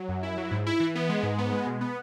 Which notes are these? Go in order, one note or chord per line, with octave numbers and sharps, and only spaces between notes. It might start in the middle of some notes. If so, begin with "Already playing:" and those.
Already playing: F#3
F#2
E4
F#3
G#2
E4
E3
B3
G#3
G#2
B3
G#3
B2
B3